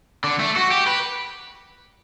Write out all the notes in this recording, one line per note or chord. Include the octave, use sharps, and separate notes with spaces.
D3
A3
F#4
G4
B4